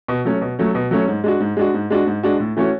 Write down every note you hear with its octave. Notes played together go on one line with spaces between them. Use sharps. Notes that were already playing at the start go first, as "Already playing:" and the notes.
B2
F#3 A3 C#4
B2
F#3 A3 C#4
B2
F#3 A3 C#4
G#2
G#3 D4 F#4
G#2
G#3 D4 F#4
G#2
G#3 D4 F#4
G#2
G#3 D4 F#4
A2
E3 A3 C#4 F#4